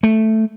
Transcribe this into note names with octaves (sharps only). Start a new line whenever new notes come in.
A3